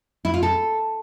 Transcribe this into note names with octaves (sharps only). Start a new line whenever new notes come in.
E4
F4
A4